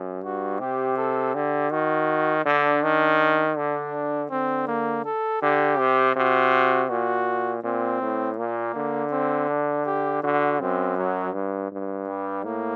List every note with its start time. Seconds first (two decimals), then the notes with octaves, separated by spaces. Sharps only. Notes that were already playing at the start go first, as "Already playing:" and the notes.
Already playing: F#2
0.24 G2 F#4
0.60 C3 G4
0.98 A4
1.35 D3 G4
1.72 D#3 F#4
2.45 D3 D4
2.83 D#3
3.56 D3 D4
4.31 D3 C4
4.67 A#3
5.05 A4
5.42 D3 G4
5.79 C3
6.16 C3 F#4
6.90 A#2 F#4
7.64 A#2 C4
8.02 A2
8.38 A#2 A#3
8.76 D3
9.12 C4
9.49 D4
9.86 G4
10.23 D3 F#4
10.60 F#2 C4
10.97 F#3
11.34 G2
11.72 G2
12.08 G3
12.45 A2 A#3